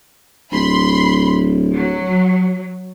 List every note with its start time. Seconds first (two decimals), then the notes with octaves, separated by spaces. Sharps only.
0.52 D1 B5 C6
1.72 F#3